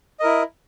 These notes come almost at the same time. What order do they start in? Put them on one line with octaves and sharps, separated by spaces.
D#5 A#4 E4